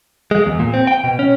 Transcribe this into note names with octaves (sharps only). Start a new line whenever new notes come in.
G#3
E2
A#2
C4
G5
B2
C#4